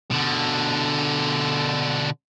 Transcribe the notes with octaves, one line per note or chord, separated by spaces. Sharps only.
B2 D3